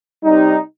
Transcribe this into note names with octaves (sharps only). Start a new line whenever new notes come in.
C3 G3 D#4